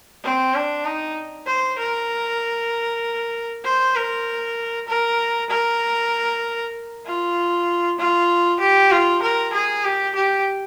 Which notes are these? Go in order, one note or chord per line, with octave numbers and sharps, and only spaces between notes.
C4
D4
D#4
C5
A#4
C5
A#4
A#4
A#4
F4
F4
G4
F4
A#4
G#4
G4
G4